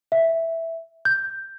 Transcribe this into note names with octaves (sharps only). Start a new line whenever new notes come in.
E5
G6